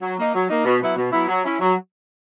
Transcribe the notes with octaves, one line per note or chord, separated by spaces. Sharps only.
F#3
A#3 D#4
F#3
A#3 D#4
B2
F#3 B3 E4
B2
F#3 B3 E4
F#3
C#4 E4
F#3